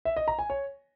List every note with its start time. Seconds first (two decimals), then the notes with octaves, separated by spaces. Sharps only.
0.05 E5
0.16 D#5
0.28 A#5
0.39 G#5
0.50 C#5